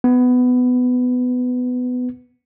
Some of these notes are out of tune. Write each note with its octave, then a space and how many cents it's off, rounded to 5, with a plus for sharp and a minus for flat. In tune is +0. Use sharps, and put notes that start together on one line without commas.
B3 +15